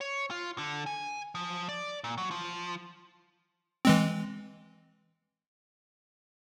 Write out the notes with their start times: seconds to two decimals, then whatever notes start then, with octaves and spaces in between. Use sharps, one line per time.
0.01 C#5
0.31 F4
0.58 D3
0.86 G#5
1.35 F3
1.69 D5
2.04 A#2
2.18 F#3
2.31 F3
3.85 E3 G#3 C4